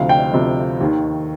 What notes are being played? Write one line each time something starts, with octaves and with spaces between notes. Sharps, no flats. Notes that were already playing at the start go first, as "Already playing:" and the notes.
Already playing: D2 C3 F3 F5
G5
D2 C3 F3
D#2 D#3